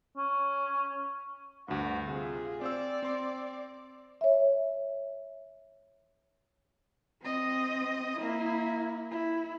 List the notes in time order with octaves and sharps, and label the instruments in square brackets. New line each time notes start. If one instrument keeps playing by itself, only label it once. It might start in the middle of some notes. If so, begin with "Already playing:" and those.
[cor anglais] C#4
[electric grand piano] D2 G2 [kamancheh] F#4
[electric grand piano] C3 [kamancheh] F4 G#4
[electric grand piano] C4 C5 E6 [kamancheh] D5
[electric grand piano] C4 C6
[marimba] C#5 E5
[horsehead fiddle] C4 D#5
A#3 E4
E4